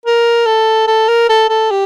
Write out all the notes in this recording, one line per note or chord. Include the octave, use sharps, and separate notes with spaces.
A#4
A4
A4
A#4
A4
A4
G4